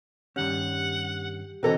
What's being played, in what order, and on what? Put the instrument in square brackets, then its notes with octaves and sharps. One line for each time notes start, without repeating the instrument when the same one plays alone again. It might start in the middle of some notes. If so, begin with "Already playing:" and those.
[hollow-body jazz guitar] G2 D#3 C#4 [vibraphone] G4 [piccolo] F#5
[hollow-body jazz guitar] B2 D3 E3 [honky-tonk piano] C4 A4 [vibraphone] F#4 D#5 [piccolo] A#5